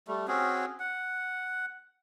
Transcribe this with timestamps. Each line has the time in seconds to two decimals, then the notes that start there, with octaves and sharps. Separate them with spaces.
0.08 G3 A3
0.28 C4 C#4 F#4 G#4
0.80 F#5